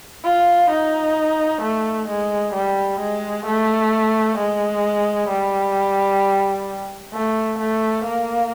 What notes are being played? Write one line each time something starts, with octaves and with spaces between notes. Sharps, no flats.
F4
D#4
A3
G#3
G3
G#3
A3
G#3
G3
A3
A3
A#3